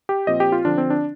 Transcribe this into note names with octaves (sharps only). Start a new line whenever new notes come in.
G4
A#2 F3 C4 D#5
G4
F4
D3 F3 C4 D4
C4
D4